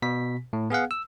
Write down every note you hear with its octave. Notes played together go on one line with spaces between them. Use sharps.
B2 B6
A2
B3 G#4 F5 F#5
E6